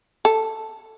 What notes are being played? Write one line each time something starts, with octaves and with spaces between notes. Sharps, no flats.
A4